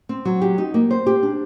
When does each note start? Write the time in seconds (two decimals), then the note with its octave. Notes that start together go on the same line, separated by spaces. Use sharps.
0.09 C4
0.25 F#3
0.42 G4
0.58 D#4
0.74 A#3
0.91 C5
1.07 G4
1.23 D4